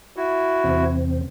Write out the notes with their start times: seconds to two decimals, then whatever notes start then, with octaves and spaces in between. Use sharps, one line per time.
0.16 E4 F#4
0.64 E2 C3 C4